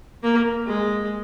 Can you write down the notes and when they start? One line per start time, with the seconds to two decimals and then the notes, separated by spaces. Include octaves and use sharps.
0.23 A#3
0.67 G#3